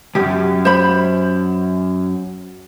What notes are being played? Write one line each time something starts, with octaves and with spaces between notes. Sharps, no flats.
C2 F#2 G4
C5 B5